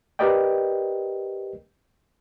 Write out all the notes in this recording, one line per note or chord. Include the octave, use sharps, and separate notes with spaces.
G4 A#4 B4 D5 D#5 G5